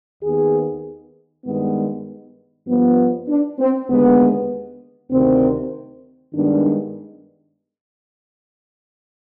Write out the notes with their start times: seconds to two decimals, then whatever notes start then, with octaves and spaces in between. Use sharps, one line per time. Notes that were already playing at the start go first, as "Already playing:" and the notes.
0.22 D#2 D#3 B3 G#4
1.45 G2 D#3 G#3 B3
2.68 G2 F3 B3
3.29 D4
3.59 C4
3.90 D#2 D3 G#3 B3
5.11 D2 C3 D#3 C4
6.34 G2 D#3 G#3 B3 D4